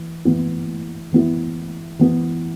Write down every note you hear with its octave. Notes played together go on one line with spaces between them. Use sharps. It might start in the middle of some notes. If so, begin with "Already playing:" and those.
Already playing: E3
E3 B3 E4
E3 B3 E4
E3 B3 E4